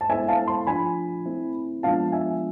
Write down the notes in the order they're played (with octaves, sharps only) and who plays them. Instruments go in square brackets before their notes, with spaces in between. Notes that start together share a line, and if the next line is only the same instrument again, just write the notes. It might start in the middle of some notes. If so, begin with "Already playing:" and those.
[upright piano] A5
[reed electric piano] G#3 B3 E4 A4 C5 [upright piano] E5 G#5
[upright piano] F5 A5
A5 C6
[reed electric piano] F3 A3 D4 F4 [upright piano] G#5 B5
[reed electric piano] A3 C4 E4
[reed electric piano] F3 G#3 B3 D4 F4 [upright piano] F5 A5
[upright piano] E5 G#5